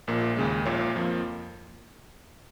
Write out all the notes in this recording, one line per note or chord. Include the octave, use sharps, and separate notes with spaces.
A#1 A#2 A#3
D#2 C#3 G#3
A#1 A#2 A#3 C#5
F2 F3 A#3